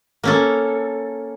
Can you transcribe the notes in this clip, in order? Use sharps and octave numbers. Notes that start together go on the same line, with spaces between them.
A#3 C#4 A4